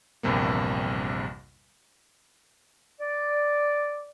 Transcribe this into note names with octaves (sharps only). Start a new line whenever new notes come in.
A#1 E2 G2 C3 G3 A#3
D5